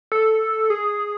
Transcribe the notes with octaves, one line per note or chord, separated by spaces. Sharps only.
A4
G#4